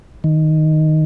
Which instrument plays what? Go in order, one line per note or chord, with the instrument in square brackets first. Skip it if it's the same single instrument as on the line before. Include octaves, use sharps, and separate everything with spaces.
[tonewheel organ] D#3